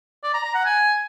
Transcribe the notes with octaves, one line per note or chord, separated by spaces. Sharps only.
D5
A#5
A#5
F#5
G#5